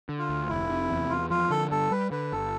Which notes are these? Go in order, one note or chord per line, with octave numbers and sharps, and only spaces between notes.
D3
F4
D2
F1 E4
C3
E2
E2 F4
F3 F4
D3 A4
G2 A4
G3 B4
D3 B4
G1 A4